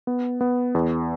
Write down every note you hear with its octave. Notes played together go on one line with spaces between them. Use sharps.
B3
B3
E2